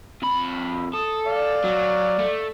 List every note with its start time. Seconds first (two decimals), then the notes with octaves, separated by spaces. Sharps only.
0.22 F2 B5
0.93 A4 D#6
1.27 D5 F5
1.64 F#3
2.20 A3